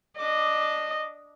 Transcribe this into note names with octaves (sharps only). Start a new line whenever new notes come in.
D4 D#5 D6